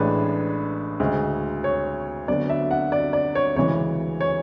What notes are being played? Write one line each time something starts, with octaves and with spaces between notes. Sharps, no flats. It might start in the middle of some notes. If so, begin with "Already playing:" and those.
Already playing: A1 A2 G#3 D4 B4
D2 C#3 G#3
C#5
D2 D3 F#3 B3 D4 D5
E5
F#5
D5
D5
C#5
D2 C#3 E3 G#3 C#5
C#5